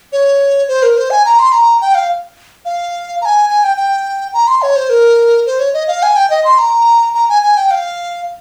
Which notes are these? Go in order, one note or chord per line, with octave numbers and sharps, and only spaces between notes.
C#5
C5
A#4
C5
G#5
A#5
C6
A#5
G5
F5
F5
A#5
G#5
G#5
G5
G5
A#5
C6
C#5
C5
A#4
C5
C#5
D#5
F5
G#5
G5
D#5
C6
A#5
A#5
G#5
G#5
G5
F5